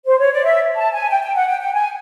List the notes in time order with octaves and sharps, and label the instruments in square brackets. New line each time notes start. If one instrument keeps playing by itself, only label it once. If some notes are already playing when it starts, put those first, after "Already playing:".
[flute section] C5
C#5
D5
E5
A5
G#5
G5
G5
F#5
G5
G5
G#5